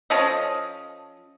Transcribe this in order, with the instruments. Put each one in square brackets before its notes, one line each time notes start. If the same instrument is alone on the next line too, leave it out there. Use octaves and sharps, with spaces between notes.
[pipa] F3 C#4 A4 D#5